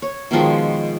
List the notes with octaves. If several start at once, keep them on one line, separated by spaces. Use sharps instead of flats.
C#5
B2 D#3 F3 G#3